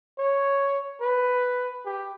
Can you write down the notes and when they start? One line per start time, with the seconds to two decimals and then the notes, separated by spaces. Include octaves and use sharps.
0.18 C#5
1.01 B4
1.86 G4